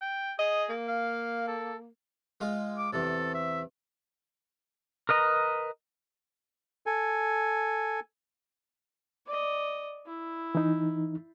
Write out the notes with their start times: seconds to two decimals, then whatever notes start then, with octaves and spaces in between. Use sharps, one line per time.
0.02 G5
0.39 G#4 D#5
0.69 A#3
0.88 F5
1.48 A4
2.41 G#3 F4 G#4
2.77 D6
2.93 E2 C3 A4
3.34 E5
5.09 A#4 B4 D#5 A#5
6.86 A4 G#5
9.26 D5 D#5
10.06 E4
10.55 E3 D#4